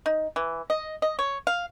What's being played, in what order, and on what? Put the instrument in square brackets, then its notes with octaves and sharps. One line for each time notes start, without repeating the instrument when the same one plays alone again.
[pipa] D#4
E3
D#5
D#5
C#5
F5